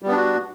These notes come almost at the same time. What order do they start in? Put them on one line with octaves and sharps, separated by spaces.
G3 B3 D4 F#4